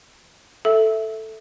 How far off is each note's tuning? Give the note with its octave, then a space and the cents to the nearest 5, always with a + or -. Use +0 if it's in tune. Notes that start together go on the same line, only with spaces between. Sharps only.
A4 +0 E5 +0